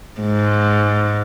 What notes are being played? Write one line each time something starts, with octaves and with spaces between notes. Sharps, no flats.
G#2